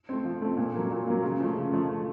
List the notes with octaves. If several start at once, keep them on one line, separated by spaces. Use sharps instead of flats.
A3 C4
F3
A3 C4
A#2
F#3 A#3
A#2
F#3 A#3
C#3
F3 A3
C#3
F3 A3